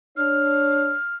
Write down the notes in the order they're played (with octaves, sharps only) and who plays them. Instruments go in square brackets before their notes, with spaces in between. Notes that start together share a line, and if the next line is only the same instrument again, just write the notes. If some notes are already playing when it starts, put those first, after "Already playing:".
[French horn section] D4 C#5 [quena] F6